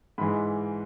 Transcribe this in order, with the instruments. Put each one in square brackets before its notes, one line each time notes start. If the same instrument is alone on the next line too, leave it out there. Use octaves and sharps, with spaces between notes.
[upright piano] G#2 E3 G#3 B5